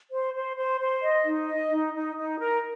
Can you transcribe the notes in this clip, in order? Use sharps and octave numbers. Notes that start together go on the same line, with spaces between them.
C5
C5
C5
C5
D#5
D#4
D#5
D#4
D#4
D#4
A#4